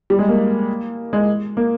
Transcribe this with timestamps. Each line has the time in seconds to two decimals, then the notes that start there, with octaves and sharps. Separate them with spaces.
0.10 G3
0.19 G#3
0.29 A#3
1.13 G#3
1.57 A#3